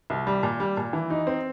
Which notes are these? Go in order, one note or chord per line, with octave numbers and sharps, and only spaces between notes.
C2
G3
A#2
G3
A#2
E3
D#4
C4